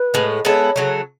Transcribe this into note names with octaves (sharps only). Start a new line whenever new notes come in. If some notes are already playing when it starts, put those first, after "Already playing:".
Already playing: B4
A2 G#3 B3
G#3 B3 E4 A4 C#5
C#3 F#3 A3